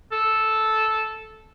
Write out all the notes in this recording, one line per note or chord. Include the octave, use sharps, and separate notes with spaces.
A4